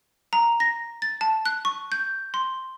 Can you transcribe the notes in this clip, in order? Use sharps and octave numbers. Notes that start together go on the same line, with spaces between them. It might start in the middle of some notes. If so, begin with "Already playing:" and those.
A#5
A#6
A6
A5
F#6
C#6
G6
C6